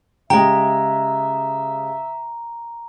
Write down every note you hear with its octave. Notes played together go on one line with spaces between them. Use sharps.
C#3 G#3 G4 E5 G5 A#5